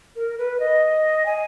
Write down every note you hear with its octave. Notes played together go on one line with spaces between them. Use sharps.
A#4
B4
D#5
G#5